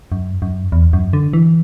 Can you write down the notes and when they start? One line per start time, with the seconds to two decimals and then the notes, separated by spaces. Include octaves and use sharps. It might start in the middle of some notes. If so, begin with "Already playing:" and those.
0.12 F#2
0.42 F#2
0.72 E2
0.93 F#2
1.13 D3
1.33 E3